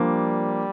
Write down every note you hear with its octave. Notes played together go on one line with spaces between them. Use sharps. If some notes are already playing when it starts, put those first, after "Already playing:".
Already playing: F3 G3 A#3 D4